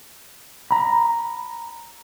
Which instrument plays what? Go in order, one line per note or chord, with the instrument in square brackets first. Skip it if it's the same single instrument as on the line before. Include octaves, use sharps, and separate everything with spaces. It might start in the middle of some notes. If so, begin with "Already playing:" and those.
[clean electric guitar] A#5 B5